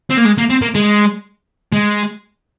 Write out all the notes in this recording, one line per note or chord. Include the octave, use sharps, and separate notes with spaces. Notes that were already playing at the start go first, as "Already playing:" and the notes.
C4
A#3
G#3
A#3
C4
A#3
G#3
G#3